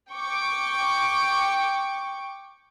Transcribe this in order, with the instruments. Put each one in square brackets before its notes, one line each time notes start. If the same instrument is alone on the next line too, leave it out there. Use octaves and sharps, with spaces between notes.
[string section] G5 C#6 D6